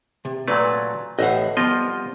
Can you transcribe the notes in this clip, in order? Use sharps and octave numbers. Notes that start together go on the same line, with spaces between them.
C3
A#2 F#3 A3 B4 D5
A1 A2 D#5 E5 F#5
C2 F3 B3 F4 D#5